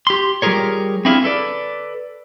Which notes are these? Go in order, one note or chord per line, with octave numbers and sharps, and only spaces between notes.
G4 C6
G3 F4 G4 G#4 A#4 C#5
C4 D4 E4 G#4 E5 F5
A4 B4 D5